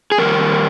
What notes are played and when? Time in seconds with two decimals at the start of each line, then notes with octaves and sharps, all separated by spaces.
0.12 G#4
0.18 F2 D#3 G3 A#4